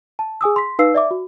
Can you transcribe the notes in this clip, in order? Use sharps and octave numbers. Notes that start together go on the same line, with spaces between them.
A5
G#4 G#5 D#6 E6
C6 B6
D#4 B4 F5 E6 C7
D5 E5 D6
F#4